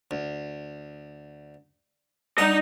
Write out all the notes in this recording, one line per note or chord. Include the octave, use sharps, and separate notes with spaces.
D2
G3 D#4 D#5 F#5